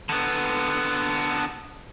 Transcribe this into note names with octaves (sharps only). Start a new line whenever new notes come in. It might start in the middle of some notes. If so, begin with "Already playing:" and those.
D3 B3